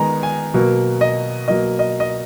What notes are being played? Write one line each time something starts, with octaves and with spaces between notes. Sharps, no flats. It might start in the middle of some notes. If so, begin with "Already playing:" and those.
Already playing: D#3 G#3 B3 G#5 A#5
G#5
B2 F#3 A#3
D#5
B2 F#3 A#3 D#5
D#5
D#5